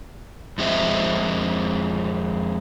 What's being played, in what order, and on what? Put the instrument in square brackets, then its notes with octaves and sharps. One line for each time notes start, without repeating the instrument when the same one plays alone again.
[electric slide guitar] F2 G#3 C4 E5